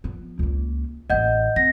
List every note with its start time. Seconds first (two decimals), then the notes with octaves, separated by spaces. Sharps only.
0.04 F3 B3
0.39 C#2 A#3
1.10 A1 E3 D#5 F#5 G6
1.56 C4 A#6